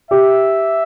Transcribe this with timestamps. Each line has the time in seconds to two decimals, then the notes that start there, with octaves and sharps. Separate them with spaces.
0.11 G4 E5